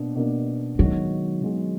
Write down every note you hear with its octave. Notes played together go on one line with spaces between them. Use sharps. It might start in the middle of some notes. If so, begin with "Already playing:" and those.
Already playing: B2 A#3 D4
B2 A#3 D4
D#3 F#3 G#3 B3
D#3 G#3 B3